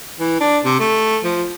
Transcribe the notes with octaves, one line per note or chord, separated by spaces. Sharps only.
E3
D4
C3
A3
F3